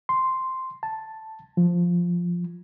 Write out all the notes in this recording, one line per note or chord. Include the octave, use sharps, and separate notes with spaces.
C6
A5
F3